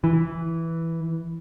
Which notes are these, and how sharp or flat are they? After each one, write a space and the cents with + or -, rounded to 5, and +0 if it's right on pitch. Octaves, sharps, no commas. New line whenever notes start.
E3 +0